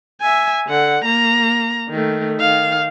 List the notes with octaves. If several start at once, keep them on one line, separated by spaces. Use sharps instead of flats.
E5 G#5
D3 F#5
A#3 A#5
D#3 A3
D#3 F5